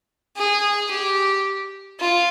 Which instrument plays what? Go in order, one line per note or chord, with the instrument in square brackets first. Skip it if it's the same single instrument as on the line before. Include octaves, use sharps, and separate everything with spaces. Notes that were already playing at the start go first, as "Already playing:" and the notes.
[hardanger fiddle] G#4
G4
F4